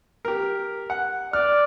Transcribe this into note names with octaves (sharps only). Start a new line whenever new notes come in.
G4 A#4
F#5
D5 F6